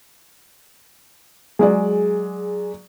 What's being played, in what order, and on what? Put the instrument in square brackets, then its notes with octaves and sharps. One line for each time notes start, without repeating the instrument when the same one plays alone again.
[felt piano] F#3 G#3 D5 [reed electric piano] G#4